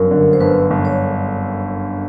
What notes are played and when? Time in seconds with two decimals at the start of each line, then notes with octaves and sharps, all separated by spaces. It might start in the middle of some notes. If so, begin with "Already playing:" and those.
Already playing: G1 F#2 A#4
0.11 D3
0.33 C5
0.41 G1 B4
0.70 G1
0.85 C#5